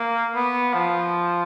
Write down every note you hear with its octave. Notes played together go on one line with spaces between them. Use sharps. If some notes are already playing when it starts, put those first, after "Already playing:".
Already playing: A#3
B3
F3